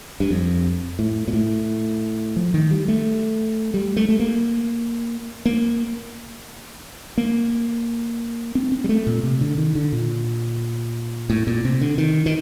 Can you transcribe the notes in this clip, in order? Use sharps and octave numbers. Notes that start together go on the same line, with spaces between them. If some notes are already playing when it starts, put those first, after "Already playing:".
G2
F2
A2
A#2
A2
F3
D#3
G3
A3
G3
A3
A3
A#3
A#3
A#3
C4
C4
G3
A3
A#2
C3
D3
D#3
D3
A#2
A2
A#2
C3
D3
D#3
D#3